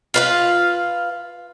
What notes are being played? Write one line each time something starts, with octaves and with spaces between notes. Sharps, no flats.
F4 B4 F5